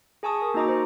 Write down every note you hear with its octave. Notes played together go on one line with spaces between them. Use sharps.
G#4 G#5 A5 C#6 D#6
A#4
A#3 D#4 F#4 D#5 A#5 D6
C5